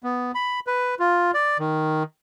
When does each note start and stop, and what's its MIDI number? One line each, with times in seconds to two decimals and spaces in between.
0.04 0.32 59
0.35 0.60 83
0.67 0.95 71
0.99 1.31 65
1.34 1.58 74
1.59 2.03 51